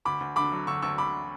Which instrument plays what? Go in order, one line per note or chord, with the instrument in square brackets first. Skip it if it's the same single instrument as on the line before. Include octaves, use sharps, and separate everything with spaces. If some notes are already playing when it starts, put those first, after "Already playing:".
[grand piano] D2 B5 D6
D2
D3 B5 D6
F#3
D2 C#6 E6
D2 C#6 E6
D2 B5 D6